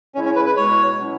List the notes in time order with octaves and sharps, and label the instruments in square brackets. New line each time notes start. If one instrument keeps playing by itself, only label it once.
[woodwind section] C#3 G#3 E4 [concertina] C#4
[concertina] C#4
B4
B4
[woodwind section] B2 G#3 E4 [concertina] C#5
[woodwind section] B2 F#3 C#4 E4